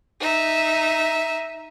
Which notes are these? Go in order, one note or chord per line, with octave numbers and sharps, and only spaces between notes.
D#4 E5